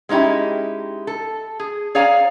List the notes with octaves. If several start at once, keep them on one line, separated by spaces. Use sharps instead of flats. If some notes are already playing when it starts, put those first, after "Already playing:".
G#3 C#4 D#4 E4 G4
A4
G#4
G#4 C#5 D5 F5 G#5 A#5